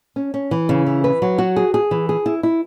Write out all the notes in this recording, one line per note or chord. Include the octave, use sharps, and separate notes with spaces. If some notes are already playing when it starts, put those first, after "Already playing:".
C#4
C#4
E3
C#3
E3
B4
F#3
F#4
G#4
G#4
E3
G#4
E4
E4